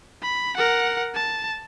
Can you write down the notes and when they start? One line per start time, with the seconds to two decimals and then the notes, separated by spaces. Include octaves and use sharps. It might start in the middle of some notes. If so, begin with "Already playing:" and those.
0.23 B5
0.57 A#4 F#5
1.15 A5